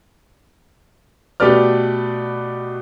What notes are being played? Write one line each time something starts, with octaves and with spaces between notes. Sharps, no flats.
B2 A3 G4 B4 D5 F6